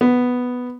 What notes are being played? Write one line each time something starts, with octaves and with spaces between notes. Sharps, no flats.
B3